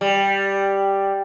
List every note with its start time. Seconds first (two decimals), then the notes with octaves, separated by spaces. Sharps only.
0.01 G3